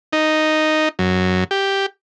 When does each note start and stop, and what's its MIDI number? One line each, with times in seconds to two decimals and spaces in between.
0.13 0.89 63
0.99 1.44 42
1.51 1.86 67